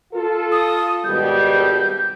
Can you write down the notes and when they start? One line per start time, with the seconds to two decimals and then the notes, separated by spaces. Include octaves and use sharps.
0.13 F4 A4
0.52 D#6
1.04 G#1 B2 G3 G6